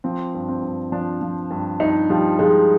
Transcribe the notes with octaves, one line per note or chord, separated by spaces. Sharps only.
F3 C4
G2
C4
G2
F3 D4
F3
G2
G2 D#4
F3 G3
F3 G#3